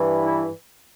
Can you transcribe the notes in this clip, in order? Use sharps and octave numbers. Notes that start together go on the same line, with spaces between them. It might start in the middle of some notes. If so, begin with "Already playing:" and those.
Already playing: G2 E3
E4